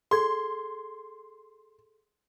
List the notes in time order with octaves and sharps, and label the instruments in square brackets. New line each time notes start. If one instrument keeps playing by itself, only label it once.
[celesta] G#4 A4 G#6 [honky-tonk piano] C6